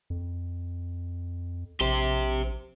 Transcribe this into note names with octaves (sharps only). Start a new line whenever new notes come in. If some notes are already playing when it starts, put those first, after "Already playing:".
F2
A#1 G4 C5